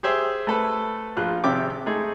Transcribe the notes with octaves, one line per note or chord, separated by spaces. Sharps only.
G4 G#4 C5 E5
A3 A4 B4
A#1 F4 F#6
G#1 C3 F3 E5 G5 D6
G#3 A3 D#4 G#4